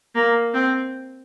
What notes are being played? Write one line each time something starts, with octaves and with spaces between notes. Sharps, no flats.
A#3
C4